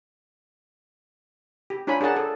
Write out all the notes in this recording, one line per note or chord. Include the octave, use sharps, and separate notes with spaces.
G4
D4 F4 C#5 G#5 B5
D4 G#4 A#4 F#5 A5
A4 D5